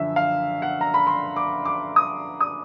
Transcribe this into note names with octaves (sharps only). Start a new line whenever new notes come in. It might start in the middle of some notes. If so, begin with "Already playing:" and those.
Already playing: F#2 D3 F3 E5
F5
F#5
A#5
B5
C6
D6
D6
D#6
D#6